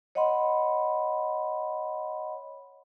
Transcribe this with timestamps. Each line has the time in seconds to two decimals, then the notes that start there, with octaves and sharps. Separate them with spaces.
0.15 C#5 D#5 F#5 B5 C6